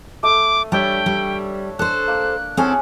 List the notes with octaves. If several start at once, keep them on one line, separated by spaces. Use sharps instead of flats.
A3 D6 D#6
G3 D4 C#5 E5 G5
G3
D4 A4 C5 F#6
A#3
C4 C#4 E4 G#4 A4 F#5